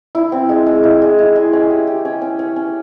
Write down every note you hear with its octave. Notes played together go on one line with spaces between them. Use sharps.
E4
C4
G#3
G#3
E4
G#3
E4
G#3
C#4
G4
G4
C#4
C#4
C#4
C#4